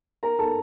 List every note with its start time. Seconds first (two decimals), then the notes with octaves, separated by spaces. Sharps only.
0.23 A#4 A#5
0.39 A4 A5